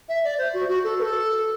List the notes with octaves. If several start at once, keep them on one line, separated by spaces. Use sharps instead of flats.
E5
D5
C5
F#4
F#4
A4
B4
A4